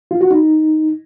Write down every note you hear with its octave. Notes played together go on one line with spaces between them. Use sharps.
F4
F#4
D#4